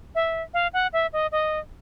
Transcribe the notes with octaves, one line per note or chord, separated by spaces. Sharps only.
E5
F5
F#5
E5
D#5
D#5